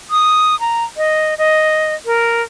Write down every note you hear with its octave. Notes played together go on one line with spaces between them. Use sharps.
D#6
A#5
D#5
D#5
A#4